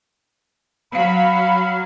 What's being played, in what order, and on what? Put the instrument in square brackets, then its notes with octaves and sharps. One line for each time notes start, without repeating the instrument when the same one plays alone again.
[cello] F#3 [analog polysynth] F5 B5